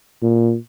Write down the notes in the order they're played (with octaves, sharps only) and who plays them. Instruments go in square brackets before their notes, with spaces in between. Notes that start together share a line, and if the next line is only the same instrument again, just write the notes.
[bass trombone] A#2